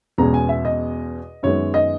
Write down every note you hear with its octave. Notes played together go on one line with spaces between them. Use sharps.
E2 B2 G#3 C#4 A#5
G#5
E5
D#5
F#2 D#3 G#3 B3 C#5
D#5